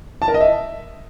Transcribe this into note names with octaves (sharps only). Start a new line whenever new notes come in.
A5
A#4
D#5
E5